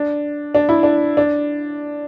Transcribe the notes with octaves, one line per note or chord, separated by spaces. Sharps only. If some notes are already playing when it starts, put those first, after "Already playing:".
Already playing: D4
D4
E4
D4
D4